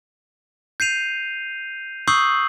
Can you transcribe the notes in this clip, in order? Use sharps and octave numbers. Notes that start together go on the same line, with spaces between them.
G6 C7 D#7 F7
C#6 D#6 E6 G6 C7 F#7